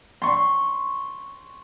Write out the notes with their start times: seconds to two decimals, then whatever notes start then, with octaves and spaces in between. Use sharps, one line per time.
0.22 C6 C#6